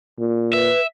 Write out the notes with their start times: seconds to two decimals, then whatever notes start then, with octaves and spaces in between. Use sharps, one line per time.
0.19 A#2
0.53 B4 E5